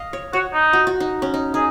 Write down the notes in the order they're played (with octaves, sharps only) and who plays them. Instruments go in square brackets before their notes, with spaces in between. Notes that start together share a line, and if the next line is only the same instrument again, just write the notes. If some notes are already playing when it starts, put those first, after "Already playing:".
Already playing: [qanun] D#5 F5
C#5
[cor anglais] F#4 [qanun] C#5
[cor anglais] D#4
[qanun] F#4
F#4
D#4
C#4
D#4
[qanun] D#4 [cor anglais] G#4